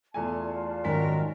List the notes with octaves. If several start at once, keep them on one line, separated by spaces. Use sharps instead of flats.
E2 A3 F4 D5 G#5 A5
G#2 D#3 F#3 C#4 A#4 B6